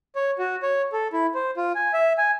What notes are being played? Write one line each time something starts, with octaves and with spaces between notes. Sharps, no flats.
C#5
F#4
C#5
A4
E4
C5
F4
G#5
E5
G#5